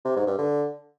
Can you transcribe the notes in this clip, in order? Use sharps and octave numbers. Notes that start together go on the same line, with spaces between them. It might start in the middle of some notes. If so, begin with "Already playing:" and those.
C3
G#2
G2
D3